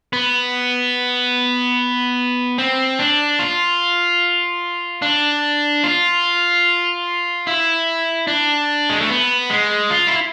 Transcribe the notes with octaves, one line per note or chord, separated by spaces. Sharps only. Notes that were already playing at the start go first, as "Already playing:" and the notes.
B3
C4
D4
F4
D4
F4
E4
D4
G#3
A3
B3
G#3
F4
E4